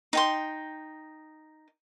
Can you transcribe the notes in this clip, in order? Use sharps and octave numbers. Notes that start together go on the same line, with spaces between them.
D#4 G5 C6